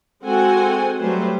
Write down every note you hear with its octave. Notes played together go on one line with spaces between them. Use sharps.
G#3 C4 F#4 A4 F#5 G#5
F#3 G3 A3 B4 C5